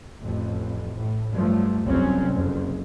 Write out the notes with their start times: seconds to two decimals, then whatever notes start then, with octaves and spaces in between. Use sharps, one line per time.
0.22 A1 F2
0.97 A2
1.32 G2 F3 F#3 A3
1.85 G1 C2 F2 F#3 C4 C#4
2.30 F#1 F2